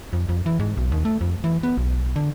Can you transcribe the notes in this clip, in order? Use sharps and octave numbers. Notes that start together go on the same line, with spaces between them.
F2
F2
E3
G#2
B1
D#2
A3
F2
E3
B3
B1
D3